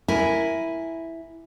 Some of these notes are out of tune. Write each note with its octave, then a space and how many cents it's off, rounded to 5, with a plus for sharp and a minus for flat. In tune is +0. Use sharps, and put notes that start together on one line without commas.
E4 +0 A#4 +5 G#5 +0